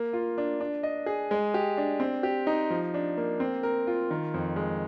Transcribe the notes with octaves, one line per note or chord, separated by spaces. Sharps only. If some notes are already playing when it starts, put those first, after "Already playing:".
Already playing: A#3
F4
D4
D4
D#5
G#4
G#3
G4
D4
C4
G4
D#4
F3
D4
A#3
C4
A#4
F4
D#3
F2
G#3